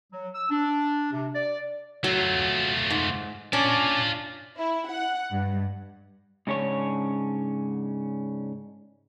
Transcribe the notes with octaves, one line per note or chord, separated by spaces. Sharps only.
F#3
E6
D4
C3
D5
F#3 A3 F4
G#2
C#4 D4 F4 D5
E4
F#5
G2
G#2 C#3 C#4 D4 C#5